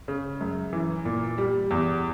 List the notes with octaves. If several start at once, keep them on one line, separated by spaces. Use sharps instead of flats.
C#3
F#2
E3
A#2
G3
E2